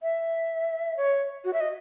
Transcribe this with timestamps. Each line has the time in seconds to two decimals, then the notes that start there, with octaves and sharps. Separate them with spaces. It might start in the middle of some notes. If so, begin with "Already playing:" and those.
0.02 E5
0.97 C#5
1.44 F#4
1.53 E5
1.60 D#5